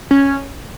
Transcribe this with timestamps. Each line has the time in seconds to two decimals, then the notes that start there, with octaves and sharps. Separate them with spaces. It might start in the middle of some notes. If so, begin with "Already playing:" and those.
0.11 C#4